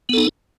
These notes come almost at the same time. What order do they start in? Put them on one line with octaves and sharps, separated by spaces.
B3 A4 D#4